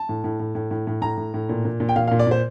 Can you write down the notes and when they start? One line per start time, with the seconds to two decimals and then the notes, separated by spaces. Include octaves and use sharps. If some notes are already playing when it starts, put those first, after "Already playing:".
Already playing: A5
0.09 A2
0.24 A2
0.40 A2
0.55 A2
0.71 A2
0.87 A2
1.01 A2 A#5
1.17 A2
1.34 A2
1.49 A#2
1.65 A#2
1.80 A#2
1.89 G5
1.96 A#2 F5
2.08 F5
2.11 A#2
2.19 D5
2.27 A#2 C5